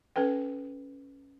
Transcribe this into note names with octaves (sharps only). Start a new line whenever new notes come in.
C#4 A4 B4 G5